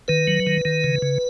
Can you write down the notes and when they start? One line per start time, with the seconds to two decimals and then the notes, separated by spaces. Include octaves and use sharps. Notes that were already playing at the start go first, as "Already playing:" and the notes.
0.08 D#3 B4
0.28 F#3
0.47 D#3
0.65 D#3
0.84 C#3
1.02 C#3